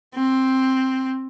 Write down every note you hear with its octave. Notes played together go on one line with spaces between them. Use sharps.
C4